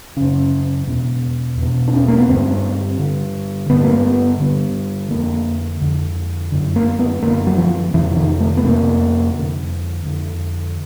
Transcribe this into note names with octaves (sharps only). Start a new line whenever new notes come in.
F#2 C#3 C#4
E2 B2
E2 B2
D4
C#4
A#3
B3
G2 D3 C4
G2 D3
G2 D3 B3
A#3
B3
G2 D3
F2 D3 A#3
F2 D3
F#2 D3
A#3
B3
F#2 D3 A#3
F#3
F3
F2 C3 E3
D#3
A3
B3
F2 C3 A#3
F2 D3
F2 D3